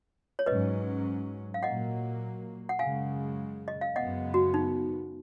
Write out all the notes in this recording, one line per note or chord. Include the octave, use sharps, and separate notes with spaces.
C#5
G#2 F#3 C#4 B4 D#5
F5
A#2 F#3 A#3 D#5 F#5
F#5
F#2 C#3 G#3 F5 G#5
D#5
F5
F#2 C#3 G#3 B3 D#5 F#5
F#4
D#4